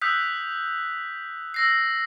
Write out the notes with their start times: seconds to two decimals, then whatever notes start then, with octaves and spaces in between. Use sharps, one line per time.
0.01 D#6 E6 F#6 G6 B6
1.54 E6 A#6 C7